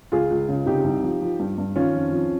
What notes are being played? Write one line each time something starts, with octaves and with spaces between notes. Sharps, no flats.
C#2 F4 G#4
C#2
C#3
C3 D#4 G4
C2
F3
F3
G2
G2
D#3 C#4 F4
F2
F2